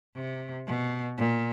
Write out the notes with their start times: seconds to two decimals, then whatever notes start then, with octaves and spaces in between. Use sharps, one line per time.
0.16 C3
0.67 B2
1.18 A#2